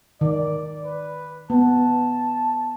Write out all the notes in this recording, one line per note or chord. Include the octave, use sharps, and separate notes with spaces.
D#3 D5
B4
B3 A5